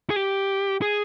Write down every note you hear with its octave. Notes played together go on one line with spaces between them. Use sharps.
G#4
G4
G#4